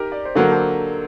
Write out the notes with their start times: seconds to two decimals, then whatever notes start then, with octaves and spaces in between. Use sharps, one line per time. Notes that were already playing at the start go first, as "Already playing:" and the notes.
Already playing: D#4 G4 A#4
0.12 D5
0.25 C5
0.35 D3 F#3 A#3 A#4
0.52 A4 C5